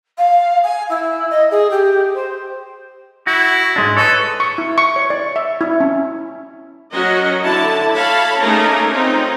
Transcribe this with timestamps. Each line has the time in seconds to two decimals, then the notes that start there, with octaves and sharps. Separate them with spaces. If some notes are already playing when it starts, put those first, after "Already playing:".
0.18 F5
0.63 G#5
0.89 E4
1.30 D#5
1.51 G#4
1.70 G4
2.14 C5
3.27 E4 F#4
3.76 G#2 G#3 D4
3.97 A4 B4 C#5
4.40 C#6
4.58 E4
4.78 C#6
4.96 C#5
5.10 D5
5.36 E5
5.61 E4
5.80 C#4
6.91 F#3 C#4 F#4 A#4 D#5
7.43 D3 E4 A5
7.95 A4 C#5 F5 A5 B5
8.41 A3 A#3 C#4 D#4 G#4 A#4
8.92 C4 C#4 D#4 F4